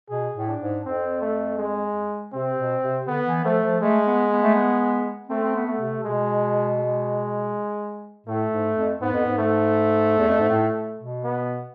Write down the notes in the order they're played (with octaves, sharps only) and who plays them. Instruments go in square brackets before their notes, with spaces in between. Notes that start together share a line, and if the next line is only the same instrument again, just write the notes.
[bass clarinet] B2 [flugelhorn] G#4
[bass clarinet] A2
[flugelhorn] D4
[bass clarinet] G#2
[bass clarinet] F2 [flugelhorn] C4
[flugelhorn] A3
G#3
[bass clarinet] C3 [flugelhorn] C4
[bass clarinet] B2
C3
[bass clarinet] D3 [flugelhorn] B3
[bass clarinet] E3
[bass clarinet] F3 [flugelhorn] A3
[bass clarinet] F3
[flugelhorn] G#3 [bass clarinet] A3
[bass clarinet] B3
B3
A3
B3
[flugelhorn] A3 [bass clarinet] C4
[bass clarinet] C4
B3
[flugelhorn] A3
[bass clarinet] C3
[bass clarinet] B2 [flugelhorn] G#3
[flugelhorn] G#3
[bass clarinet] A2 [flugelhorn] A3
[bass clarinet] G#2
F2
[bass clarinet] G#2 [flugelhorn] B3
[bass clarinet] F2
G#2
[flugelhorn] A3
[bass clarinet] E2
F2
G#2
A2
B2
[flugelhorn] B3